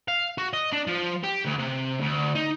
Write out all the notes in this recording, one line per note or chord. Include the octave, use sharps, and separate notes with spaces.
F5
F#4
D#5
D4
F3
G4
D2
C3
D2
D#4